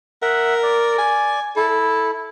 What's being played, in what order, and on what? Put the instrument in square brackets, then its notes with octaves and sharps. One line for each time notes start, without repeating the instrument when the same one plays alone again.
[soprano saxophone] A#4 [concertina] E5 F#5
[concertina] D5
[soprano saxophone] G#5
[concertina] E4 [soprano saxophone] A4